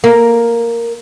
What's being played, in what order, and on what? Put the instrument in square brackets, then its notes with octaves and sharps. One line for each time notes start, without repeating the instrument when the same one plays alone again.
[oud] A#3